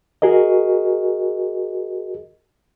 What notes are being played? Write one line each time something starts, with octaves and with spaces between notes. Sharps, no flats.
F#4 G#4 A#4 D#5